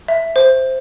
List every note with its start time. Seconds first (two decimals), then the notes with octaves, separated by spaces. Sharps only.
0.08 E5
0.36 C5